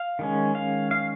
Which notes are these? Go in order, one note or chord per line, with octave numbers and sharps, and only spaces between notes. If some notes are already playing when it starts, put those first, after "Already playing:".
Already playing: F5
D#3 G#3 C#4
F5
F5